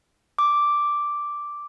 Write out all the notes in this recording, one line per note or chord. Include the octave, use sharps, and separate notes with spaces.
D6